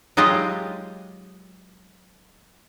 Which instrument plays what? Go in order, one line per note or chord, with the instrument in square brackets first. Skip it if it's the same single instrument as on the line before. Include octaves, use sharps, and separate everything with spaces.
[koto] F#3 G#3 F4 G4 D#5